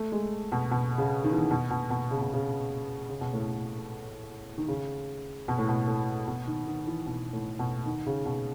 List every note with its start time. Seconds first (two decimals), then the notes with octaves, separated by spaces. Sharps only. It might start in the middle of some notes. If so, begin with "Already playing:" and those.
Already playing: A3
0.12 G#3
0.52 B2
0.71 B2
0.98 C#3
1.24 D#3
1.32 E3
1.39 D#3
1.51 B2
1.71 B2
1.90 B2
2.11 C#3
2.21 B2
2.34 C#3
3.10 C#3
3.21 B2
3.33 A2
3.45 B2
4.58 D#3
4.68 C#3
5.48 B2
5.58 A2
5.69 B2
5.88 A2
6.28 B2
6.47 D#3
6.67 D#3
6.87 E3
7.07 B2
7.33 A2
7.59 B2
7.86 D#3
8.07 C#3
8.26 B2